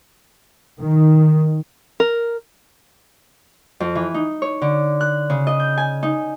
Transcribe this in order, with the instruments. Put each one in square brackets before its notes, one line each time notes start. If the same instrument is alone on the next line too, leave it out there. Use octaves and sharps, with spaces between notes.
[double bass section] D#3
[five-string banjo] A#4
[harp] F2
E3
D#4
C#5
D3
F#6
C#3
D#5
G6
G#5
D#4